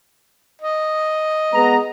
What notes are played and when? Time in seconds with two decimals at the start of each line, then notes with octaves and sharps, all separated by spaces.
0.62 D#5
1.54 G#3 B3 A#5